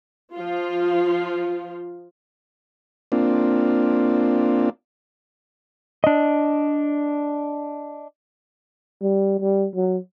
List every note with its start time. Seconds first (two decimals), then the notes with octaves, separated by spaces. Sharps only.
0.34 F3 F4
3.12 A#3 C4 D4 F4
6.04 D4 D#5
9.01 G3
9.40 G3
9.75 F#3